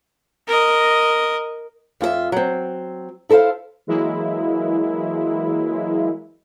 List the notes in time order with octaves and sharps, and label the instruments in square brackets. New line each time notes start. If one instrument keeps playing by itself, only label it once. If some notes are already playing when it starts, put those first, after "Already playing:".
[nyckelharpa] A#4 D#5
[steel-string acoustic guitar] F2 F4 G#4 E5
F#3 C4
E4 A4 A#4 C5 F5
[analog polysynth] E3 F#3 G#3 A#3 E4